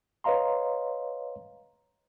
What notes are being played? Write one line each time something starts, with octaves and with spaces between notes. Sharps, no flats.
B4 C#5 D#5 F5 A#5 C6